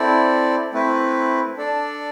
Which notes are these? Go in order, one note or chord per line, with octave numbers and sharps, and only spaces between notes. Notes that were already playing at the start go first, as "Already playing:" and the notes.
Already playing: C4 E4 A4 D5
A3 C4 E4 B4
D4 A4 D5